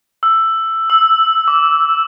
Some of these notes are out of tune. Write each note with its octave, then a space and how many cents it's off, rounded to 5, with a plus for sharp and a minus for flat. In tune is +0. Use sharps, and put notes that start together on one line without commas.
E6 +10
E6 -5
D6 -25